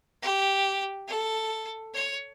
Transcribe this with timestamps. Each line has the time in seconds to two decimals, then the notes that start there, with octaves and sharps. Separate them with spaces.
0.22 G4
1.07 A4
1.94 C#5